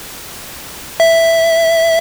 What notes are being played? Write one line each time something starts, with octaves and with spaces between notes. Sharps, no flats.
E5